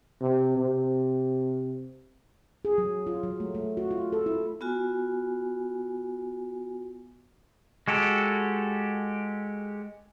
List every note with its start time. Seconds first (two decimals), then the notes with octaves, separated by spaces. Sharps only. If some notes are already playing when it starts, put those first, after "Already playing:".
0.21 C3
0.57 C3
2.65 G#4
2.78 F#3
3.07 F4
3.23 F#3
3.40 A3
3.55 A3
3.77 F#4
3.91 F4
4.12 A4
4.26 E4
4.61 B3 F4 F#4 G#5
7.88 G#3 F#4 G4 A4